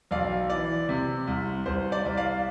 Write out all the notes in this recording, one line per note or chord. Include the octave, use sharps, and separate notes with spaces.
B1 D5 F5
E3 D5
C3
C2
C2 C5
D5
C2
D5 F5